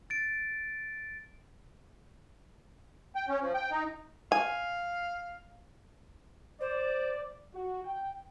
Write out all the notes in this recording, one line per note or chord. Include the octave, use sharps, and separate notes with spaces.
A6 D7
G5
C#4
F3
G5
D#4
F5 G#5
C5 D5
F#4
G5